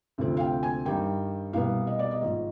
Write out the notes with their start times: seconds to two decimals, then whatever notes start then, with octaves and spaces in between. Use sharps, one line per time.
0.18 D2 C3 F3 C4
0.37 F5
0.40 G5
0.63 G#5
0.86 G2 D#3 G3 G5
1.53 C2 B2 G3 B3 F5
1.87 D#5
1.99 D5
2.11 D#5
2.21 G#1 G#2 F3